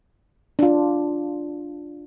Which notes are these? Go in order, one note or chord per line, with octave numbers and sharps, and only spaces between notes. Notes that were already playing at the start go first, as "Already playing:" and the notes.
D4 F4